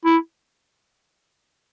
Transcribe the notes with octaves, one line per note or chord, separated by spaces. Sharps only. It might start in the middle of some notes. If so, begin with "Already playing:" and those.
E4